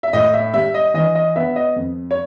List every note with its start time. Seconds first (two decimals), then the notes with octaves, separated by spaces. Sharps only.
0.03 E5
0.13 A2 D#5
0.33 E5
0.54 G3 E5
0.74 D#5
0.94 E3 D#5
1.15 D#5
1.36 B3 E5
1.56 D#5
1.76 F2
2.11 C#5